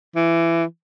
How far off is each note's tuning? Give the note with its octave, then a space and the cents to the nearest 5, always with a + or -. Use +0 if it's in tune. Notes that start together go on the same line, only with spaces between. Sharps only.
E3 +20